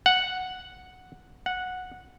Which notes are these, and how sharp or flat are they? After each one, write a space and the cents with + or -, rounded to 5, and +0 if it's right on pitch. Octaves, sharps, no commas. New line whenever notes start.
F#5 -5
F#5 -10